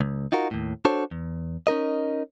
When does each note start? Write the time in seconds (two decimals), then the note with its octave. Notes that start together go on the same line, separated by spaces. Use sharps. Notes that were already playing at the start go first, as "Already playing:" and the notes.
0.01 C#2
0.32 D#4 F4 F#4 A#4
0.51 D#2 A2
0.85 D4 F#4 A4 C5 C#5
1.11 E2
1.67 C#4 D#4 A#4 D#5